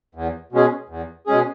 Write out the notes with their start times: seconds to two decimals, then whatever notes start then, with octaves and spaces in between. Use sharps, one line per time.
0.15 E2
0.52 B2 G#3 C#4 G#4
0.89 E2
1.27 B2 G#3 C#4 G#4